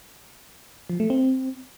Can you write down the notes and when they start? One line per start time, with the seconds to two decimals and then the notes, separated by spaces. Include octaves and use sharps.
0.90 F3
1.00 A3
1.10 C4